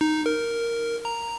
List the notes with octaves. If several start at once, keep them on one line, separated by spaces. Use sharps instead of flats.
D#4
A#4
A#5